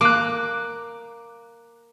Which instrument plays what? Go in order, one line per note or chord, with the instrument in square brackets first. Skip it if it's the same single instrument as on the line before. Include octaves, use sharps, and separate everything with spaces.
[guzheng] A#3 [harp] D6 F#6